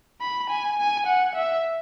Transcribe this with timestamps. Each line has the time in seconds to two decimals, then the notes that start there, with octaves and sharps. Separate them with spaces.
0.21 B5
0.50 G#5
0.78 G#5
1.06 F#5
1.36 E5